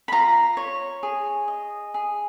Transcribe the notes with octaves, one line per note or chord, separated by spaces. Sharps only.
B5
F4 A#5
C#5
G#4
D#5
G#4